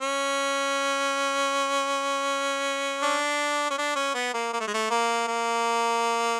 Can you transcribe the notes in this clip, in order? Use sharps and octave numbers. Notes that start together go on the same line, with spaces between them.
C#4
D4
C#4
D4
C#4
B3
A#3
A#3
A3
G#3
A3
A#3
A#3